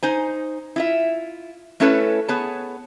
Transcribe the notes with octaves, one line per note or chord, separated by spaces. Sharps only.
D#4 C5 G#5
E4 F4 E5
A3 C#4 E4 A4 B4 C#5
B3 G#4 C#5 A5